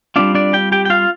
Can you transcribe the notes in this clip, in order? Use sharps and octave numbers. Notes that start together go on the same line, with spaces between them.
G3 C4 D4 F4 D5
D4 D5
G4 G5
G4 G5
G5
F4 F5